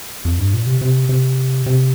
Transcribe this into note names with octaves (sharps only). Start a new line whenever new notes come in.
F2
G2
A#2
C3
C3
C3
C3